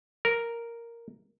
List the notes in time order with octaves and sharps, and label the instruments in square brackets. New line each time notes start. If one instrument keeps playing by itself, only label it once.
[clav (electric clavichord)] A#4